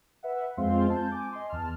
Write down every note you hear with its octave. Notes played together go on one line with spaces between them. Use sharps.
B4 E5 F#5
F2 G#3 C4 F4 F5 C6
A5 G6
G#5 D6
D#5 C6
E2 A5 F6